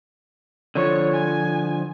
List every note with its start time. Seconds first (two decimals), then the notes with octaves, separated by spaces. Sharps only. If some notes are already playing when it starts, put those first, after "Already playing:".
0.75 D3 F3 C#5
1.13 G#5